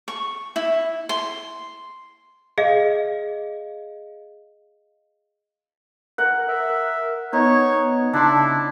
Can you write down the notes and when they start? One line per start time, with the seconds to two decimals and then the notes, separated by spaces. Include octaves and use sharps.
0.08 C#6
0.56 E4
1.09 C6
2.58 G#4 D#5 F5
6.18 A#4 F#5
6.48 A#4 E5
7.33 B3 D#4 C#5
8.13 C#3 D4 E4 A5 C6